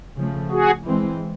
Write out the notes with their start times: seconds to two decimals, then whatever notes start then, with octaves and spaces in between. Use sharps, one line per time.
0.17 C#3 F3 A3
0.51 F#4 G#4
0.85 E3 G#3 C4